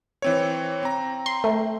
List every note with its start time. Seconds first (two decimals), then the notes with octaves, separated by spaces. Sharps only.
0.22 E3 C4 C#5
0.83 C4 A#5
1.26 C6
1.44 A3